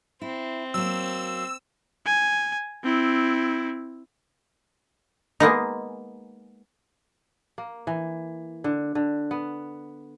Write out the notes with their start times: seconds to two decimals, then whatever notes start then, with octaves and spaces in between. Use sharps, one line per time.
0.22 C4 E4
0.74 F#3 A#3 E6
2.06 G#5
2.83 C4 E4
5.40 G#3 A#3 B3 D#4
7.58 A#3
7.87 E3
8.64 D3
8.95 D3
9.31 B3